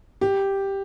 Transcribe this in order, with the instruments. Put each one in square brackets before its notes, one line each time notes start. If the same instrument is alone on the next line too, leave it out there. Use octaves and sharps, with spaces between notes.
[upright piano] G4